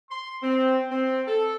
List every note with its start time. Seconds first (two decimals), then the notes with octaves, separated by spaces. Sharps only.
0.10 C6
0.42 C4
0.90 C4
1.27 A4